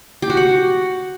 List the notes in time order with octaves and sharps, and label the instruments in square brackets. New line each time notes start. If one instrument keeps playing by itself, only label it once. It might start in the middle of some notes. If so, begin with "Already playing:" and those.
[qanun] G4
F#4
F#5